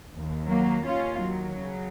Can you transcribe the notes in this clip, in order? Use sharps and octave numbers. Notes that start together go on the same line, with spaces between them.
D#2 D#3
F#3 A#3
D#2 D#3 C#4 F4
F#3
C#3